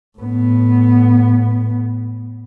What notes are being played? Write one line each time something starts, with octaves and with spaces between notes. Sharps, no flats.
A2 B3